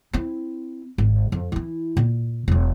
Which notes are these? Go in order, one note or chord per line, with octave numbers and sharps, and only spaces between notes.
C4 E4
G#1
F2
E3 E4
A#2
E1 F#3